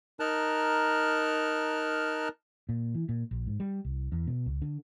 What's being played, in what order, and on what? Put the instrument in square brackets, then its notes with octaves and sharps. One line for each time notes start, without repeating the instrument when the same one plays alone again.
[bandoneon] D#4 A#4 A5 F6 F#6
[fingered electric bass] A#2
E3
A#2
A#1
G#2
G3
C2
E2
B2
C#2
D3